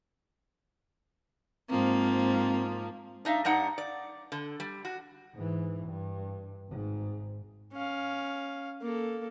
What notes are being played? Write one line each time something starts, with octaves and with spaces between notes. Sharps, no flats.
G#2 F3 A#3 C4
D4 D#4 E5 F5
G2 D4 D#4 F#5
D5
D3
G3
F#4
G#2 E3
G2
G#1 G#2
C#4 F5
A#3 A4